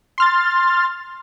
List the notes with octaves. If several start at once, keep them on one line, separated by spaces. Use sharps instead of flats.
C6 F6 A6